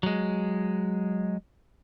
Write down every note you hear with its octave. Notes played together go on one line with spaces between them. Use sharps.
F#3 G#3